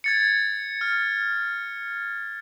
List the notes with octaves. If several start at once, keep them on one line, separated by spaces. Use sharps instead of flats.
G#6 A6 C#7
F6